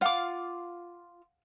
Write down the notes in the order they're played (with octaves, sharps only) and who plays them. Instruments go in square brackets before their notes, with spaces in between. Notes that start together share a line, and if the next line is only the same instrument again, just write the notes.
[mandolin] F4 D6 [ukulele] F5 F#5